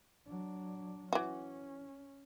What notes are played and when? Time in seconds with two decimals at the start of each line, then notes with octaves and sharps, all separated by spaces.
0.28 F#3 D4
1.13 E3 C#4 F#4